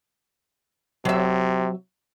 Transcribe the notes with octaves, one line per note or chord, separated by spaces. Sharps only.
C3 F#3 E5